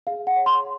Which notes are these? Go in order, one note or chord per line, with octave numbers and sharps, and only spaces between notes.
G#4 F5
F#5
C#5
C6